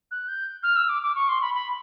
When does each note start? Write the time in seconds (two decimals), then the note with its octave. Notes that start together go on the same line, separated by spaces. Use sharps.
0.11 F#6
0.28 G6
0.63 F6
0.76 E6
0.89 D6
1.03 D6
1.15 C#6
1.29 C6
1.41 B5
1.54 B5